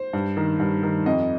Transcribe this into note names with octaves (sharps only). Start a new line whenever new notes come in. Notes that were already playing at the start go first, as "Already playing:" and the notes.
Already playing: C5
G2
D#3
G2
D#3
F2 D#5